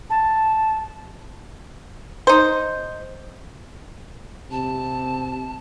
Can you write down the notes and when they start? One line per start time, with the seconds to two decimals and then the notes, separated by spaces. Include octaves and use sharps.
0.10 A5
2.27 D#4 C5
4.51 C3 A5